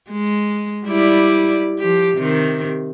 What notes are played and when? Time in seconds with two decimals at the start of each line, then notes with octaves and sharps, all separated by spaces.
0.10 G#3
0.86 G3 E4 D5
1.79 F3 G4
2.17 C3 D#3